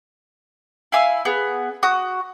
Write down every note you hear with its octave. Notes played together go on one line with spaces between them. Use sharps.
E4 F5 G#5 E6
B3 G#4
F#4 D#6